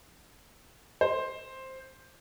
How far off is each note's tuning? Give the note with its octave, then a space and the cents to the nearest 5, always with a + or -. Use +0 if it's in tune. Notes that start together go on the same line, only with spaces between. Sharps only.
C5 +5